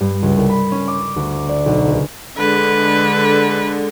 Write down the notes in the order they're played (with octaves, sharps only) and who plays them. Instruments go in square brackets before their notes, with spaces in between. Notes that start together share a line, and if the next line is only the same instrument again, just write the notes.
[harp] G2
C#2
C2
B5
C#4
D6
D2
D6
D5
B1
C#2
[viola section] D3 G#3 [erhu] B4